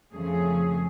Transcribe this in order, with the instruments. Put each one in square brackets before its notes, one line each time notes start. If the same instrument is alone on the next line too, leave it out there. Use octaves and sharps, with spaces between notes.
[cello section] F2 C#3 A3 G#4